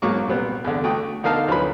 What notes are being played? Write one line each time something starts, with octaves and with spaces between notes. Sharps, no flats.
G#2 B2 F#3 A#3 C#6 D6
C2 A#2 G3 B3 C4
E2 D3
A3 F#4 G5 D#6
B2 D3 D#4 A#4 F5 A5
D2 F3 F#3 C#4 B4 B5